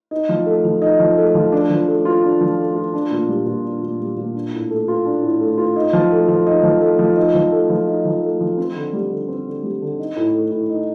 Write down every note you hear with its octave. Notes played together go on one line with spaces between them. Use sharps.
D#4
F3
A3
F3
D#4
F3
A3
F3
D4
F3
A3
F4
D4
F3
A3
F4
D4
A#2
G3
A#2
D4
A#2
G3
A#2
D4
A2
A3
F4
D4
A2
A3
F4
D#4
F3
A3
F3
D#4
F3
A3
F3
D#4
F3
A3
F3
D#4
F3
A3
F3
C4
D3
G3
D3
C4
D3
G3
D3
D#4
A2
A3
A2
D#4